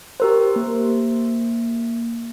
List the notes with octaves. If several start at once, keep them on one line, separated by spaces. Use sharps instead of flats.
G4 A#4 C5
A#3